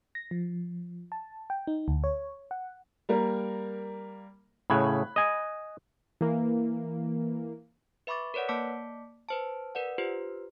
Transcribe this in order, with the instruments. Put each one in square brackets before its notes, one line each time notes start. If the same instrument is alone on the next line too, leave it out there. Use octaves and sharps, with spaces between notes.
[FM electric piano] A#6
F3
A5
G5
D#4
D2
C#5
F#5
[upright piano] G3 A#3 A#4
[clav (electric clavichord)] A2 C#3 [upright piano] B5 F#6 G#6
[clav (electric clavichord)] D#5 G#5
[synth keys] E3 A#3
[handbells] B4 E5 B5 C#6 D6 A6
A#4 B4 C#5 D5 F#5
A#3 D5 A5 D6 B6 C#7
B4 C5 A5
A#4 B4 D5 F#5
F4 G4 B4 C5